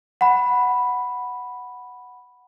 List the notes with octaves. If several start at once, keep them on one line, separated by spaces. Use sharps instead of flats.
F#5 B5